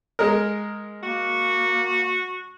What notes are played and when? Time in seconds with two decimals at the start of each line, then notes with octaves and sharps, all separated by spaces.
0.19 G#3 A#4
1.03 A#3 F#4